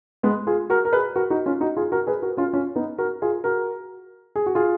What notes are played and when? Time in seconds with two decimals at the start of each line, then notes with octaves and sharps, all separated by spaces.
0.23 G#3 B3
0.47 F4 G#4
0.70 F#4 A#4
0.85 A#4
0.92 G#4 B4
1.16 F#4 A#4
1.30 D#4 F#4
1.46 C#4 F4
1.61 D#4 F#4
1.77 F4 G#4
1.92 F#4 A#4
2.07 G#4 B4
2.22 F#4 A#4
2.37 C#4 F4
2.53 C#4 F4
2.76 B3 D#4
2.98 F#4 A#4
3.22 F4 G#4
3.44 F#4 A#4
4.36 G#4
4.46 F#4
4.55 F4 G#4